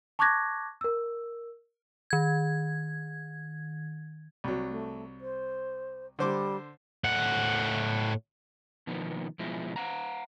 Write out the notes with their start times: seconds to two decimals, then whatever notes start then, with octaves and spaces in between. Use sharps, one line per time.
0.19 A5 C#6 D6 F#6 G#6 A#6
0.81 A#4 E6
2.10 D#3 G#6
4.44 C2 F#3
4.68 A3
5.21 C5
6.19 D3 G3 C5 D6
7.04 A2 F#5
8.87 B2 D#3 F3 A#3 B3
9.39 B2 F3 G#3 E4
9.76 F5 F#5 A#5